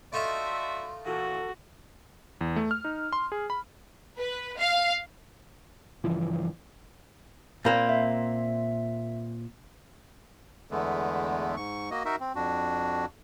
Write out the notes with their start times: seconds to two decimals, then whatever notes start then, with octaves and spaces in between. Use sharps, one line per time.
0.13 A3 D#4 F4 F#4 D5 E5 C6
1.06 A#2 E3 F#4 A4
2.41 E2
2.56 A3
2.71 F6
2.84 D#4
3.13 C6
3.32 G#4
3.50 B5
4.17 B4
4.56 F5
6.04 G2 C#3 E3 F3
7.65 A#2 A#3 C4 F5 B5 G6
7.89 E5
10.71 E2 D3 G#3 A3 B3
11.57 G#2 C#6
11.91 A#3 F#4 D#5
12.05 D#4 F#4 A#4 E5
12.20 C4
12.35 F2 D4 F#4